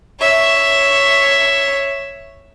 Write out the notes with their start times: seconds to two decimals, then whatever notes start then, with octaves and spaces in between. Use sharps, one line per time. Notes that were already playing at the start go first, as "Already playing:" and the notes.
0.20 C#5 E5